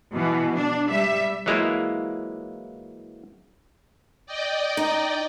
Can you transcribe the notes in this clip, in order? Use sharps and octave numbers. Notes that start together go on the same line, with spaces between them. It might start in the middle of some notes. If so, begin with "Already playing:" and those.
B2 E3
D4
G3 E5
E3 F#3 G#3 A#3 E4 F4
D5 D#5 G5
D#4